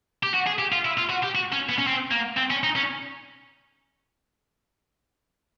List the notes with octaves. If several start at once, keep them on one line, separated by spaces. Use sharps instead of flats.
G4
F#4
G#4
G4
F4
E4
F4
F#4
G4
F#4
C#4
B3
C#4
C4
A#3
C4
C#4
D#4
C#4